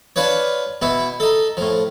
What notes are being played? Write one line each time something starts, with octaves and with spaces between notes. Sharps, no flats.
D4 F4 B4 C#5
B2 B3 E4
D#4 A4
A2 F3